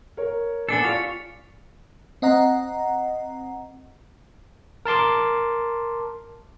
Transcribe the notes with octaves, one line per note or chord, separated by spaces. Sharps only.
A#4 C#5
B3 D4 A4 G#5 A6 C#7
F4 G4 C#5 D5 F5
C4 D#5 F#5 A#5
A#4 A5 C6 D6